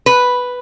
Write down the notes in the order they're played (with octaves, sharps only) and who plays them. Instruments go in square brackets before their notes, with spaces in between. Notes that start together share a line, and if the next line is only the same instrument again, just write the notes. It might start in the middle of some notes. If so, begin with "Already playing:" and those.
[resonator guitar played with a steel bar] B4